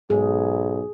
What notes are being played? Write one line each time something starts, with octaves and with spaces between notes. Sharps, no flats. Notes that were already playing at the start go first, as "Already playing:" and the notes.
B1 G#2 G#4